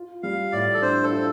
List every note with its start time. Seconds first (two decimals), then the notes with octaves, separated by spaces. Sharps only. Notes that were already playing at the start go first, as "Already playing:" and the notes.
Already playing: F4
0.23 G3 F5
0.52 A2 D5
0.74 A4
0.82 D4 C5
1.03 A4
1.11 F4